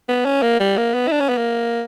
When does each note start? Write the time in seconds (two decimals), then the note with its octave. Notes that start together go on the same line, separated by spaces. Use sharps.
0.09 B3
0.25 C#4
0.42 A#3
0.60 G3
0.77 A#3
0.94 B3
1.07 E4
1.12 D4
1.20 C#4
1.29 B3
1.37 A#3